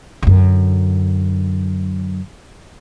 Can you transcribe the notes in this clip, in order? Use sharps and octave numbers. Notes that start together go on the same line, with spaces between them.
F#2 D3